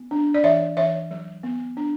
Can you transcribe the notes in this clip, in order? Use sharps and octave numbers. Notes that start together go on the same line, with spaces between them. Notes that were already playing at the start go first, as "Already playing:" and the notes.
Already playing: B3
D4
D5
E3 C#5 E5
E3 C#5 E5
F#3
B3
D4